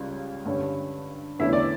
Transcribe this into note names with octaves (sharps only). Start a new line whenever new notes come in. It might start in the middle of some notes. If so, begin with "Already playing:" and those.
Already playing: C#2 C#3 G3
G2 D3 G3 C#4
E2 D3 A3 C#4 E4 E5
D5